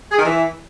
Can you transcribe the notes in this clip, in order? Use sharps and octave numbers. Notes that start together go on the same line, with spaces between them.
G#4
D#3
E3